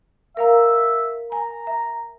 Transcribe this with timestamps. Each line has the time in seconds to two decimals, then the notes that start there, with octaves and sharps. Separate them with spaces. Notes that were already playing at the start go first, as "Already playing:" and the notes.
0.37 A#4 E5 F5 A#5
1.32 G#5 A#5
1.67 E5